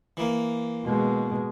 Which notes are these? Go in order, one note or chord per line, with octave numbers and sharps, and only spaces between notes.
E3 A#3
B2 G#3